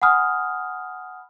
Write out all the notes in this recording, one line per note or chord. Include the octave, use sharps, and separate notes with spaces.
F#5 G#5 B5 D#6 F6